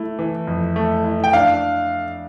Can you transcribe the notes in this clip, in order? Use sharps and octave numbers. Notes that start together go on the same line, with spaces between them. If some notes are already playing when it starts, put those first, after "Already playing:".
Already playing: A3 E4
E3
F2
A3
E4
G5
D4 F5